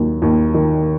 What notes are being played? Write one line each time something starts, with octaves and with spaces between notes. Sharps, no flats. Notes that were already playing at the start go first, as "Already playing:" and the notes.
Already playing: D#2 F#3
D#2
D#3